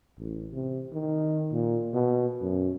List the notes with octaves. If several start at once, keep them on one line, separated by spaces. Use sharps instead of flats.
A1
C3
D#3
A#2
B2
F#2